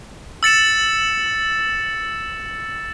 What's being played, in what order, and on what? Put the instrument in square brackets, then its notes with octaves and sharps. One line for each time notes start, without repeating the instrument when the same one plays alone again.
[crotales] E6 A6 C#7 E7